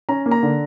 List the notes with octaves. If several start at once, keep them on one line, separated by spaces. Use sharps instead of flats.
C#4 A#5
A#3
A#5
D3